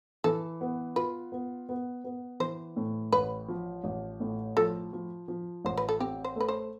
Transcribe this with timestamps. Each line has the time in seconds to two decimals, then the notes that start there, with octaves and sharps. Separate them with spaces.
0.24 E3 A4
0.61 B3
0.96 F4 B4
1.32 B3
1.69 B3
2.04 B3
2.40 E3 C5
2.76 A2
3.12 A1 B4
3.48 F3
3.84 A1
4.20 A2
4.57 F3 A4
4.93 F3
5.28 F3
5.65 A1 C5
5.77 B4
5.89 A4
6.00 C4 G4
6.24 C5
6.36 A3 B4
6.48 C5